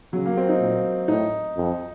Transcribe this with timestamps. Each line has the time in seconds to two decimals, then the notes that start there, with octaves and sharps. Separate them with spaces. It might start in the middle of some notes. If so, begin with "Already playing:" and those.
0.13 C#3 F#3
0.26 A#3
0.37 C4
0.49 D#4
0.60 A#2
1.08 A2 D#4
1.57 F2